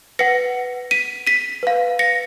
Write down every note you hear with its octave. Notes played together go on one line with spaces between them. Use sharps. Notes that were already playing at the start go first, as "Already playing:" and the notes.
B4 F#5 A#6 C#7
B6 D#7
B6 D#7
B4 F5
A#6 C#7